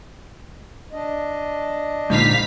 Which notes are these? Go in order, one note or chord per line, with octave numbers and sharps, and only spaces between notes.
D4 D#5
A#1 G#2 D3 D#4 F5 B6